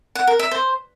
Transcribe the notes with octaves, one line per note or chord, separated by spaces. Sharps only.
F#5
A#4
E5
C5